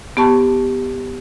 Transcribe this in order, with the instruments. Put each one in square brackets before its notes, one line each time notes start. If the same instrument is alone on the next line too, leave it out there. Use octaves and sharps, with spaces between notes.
[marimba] B3 G4 A5 C#6